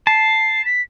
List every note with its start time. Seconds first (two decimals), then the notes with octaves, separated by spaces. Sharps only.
0.07 A5 C7
0.65 B6